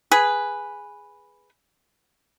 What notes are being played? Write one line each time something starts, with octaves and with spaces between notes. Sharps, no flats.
G#4 B4